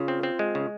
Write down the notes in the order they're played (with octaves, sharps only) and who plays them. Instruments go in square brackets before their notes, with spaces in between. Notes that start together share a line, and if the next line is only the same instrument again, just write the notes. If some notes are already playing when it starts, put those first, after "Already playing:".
Already playing: [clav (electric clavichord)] C#3 [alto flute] F4
[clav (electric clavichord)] C4
C4
G#3
C#3